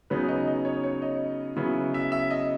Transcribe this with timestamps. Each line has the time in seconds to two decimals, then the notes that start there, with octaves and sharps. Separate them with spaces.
0.10 C#3 F#3 B3 D#4 B4
0.29 D#5
0.47 D#5
0.65 C#5
0.84 C#5
1.02 D#5
1.56 C#3 F#3 B3 E4
1.94 E5
2.12 E5
2.30 D#5